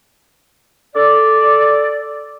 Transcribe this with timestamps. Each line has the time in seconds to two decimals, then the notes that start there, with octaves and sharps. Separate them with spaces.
0.96 A4 D5